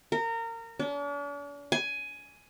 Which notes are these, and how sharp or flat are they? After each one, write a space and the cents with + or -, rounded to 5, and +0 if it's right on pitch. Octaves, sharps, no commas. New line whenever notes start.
A#4 -25
D4 -45
G#5 +10